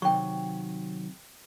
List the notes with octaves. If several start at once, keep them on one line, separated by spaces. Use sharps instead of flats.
C3 D#3 F#3 G5 C#6